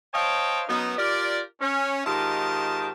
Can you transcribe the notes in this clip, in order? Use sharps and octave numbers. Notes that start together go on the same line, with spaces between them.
C5 C#5 D#5 F5 G5 A5
F#2 B3 D#4
F4 G4 A#4 D5
C#4
G#2 D#3 F4 G4 D#5 A5